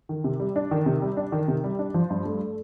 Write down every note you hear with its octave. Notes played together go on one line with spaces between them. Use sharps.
D#3
C3
G3
D4
D#3
C3
G3
D4
D#3
C3
G3
D4
F3
G2
A3